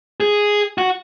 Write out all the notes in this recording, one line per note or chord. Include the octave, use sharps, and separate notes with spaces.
G#4
F#4